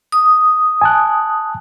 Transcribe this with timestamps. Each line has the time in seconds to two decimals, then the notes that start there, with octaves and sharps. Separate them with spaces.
0.12 D#6
0.81 G#5 A5 F#6